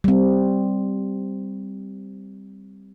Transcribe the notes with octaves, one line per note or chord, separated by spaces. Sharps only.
G3 C4